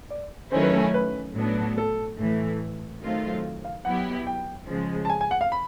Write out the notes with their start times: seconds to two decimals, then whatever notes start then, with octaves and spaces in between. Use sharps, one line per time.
0.10 D5
0.52 D#3 F#3 A3 C#4 E4 C5
0.63 B4
0.73 A4
0.94 B4
1.35 A2 F#3 B3 D4
1.78 A4
2.18 A2 E3 A3
3.02 D#3 F#3 A3 C4 F4
3.65 F5
3.85 F#3 B3 E4 G4 F#5
4.27 G5
4.68 C#3 F3 G#3
5.05 A5
5.10 G#5
5.21 G#5
5.31 F#5
5.41 F5
5.52 B5